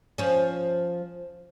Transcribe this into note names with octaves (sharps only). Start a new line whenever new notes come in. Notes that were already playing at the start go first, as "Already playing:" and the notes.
F3 C#4